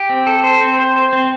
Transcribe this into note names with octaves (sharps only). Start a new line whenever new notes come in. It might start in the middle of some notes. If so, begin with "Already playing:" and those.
Already playing: G4
C4
A4
C5
C4
C5
C5
C4